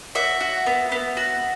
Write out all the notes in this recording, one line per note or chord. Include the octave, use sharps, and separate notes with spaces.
F#4 E5
F#4
B3
B3
F#4